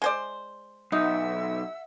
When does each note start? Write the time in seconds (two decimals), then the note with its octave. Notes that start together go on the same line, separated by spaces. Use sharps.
0.02 G#3 C5 D5
0.92 B1 D#4 E5 F#5 E6